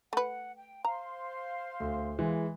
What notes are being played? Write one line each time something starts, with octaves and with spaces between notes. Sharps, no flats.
A3 B4 F#5
G5
C5 F5 A#5 C6
D2
E3 G#3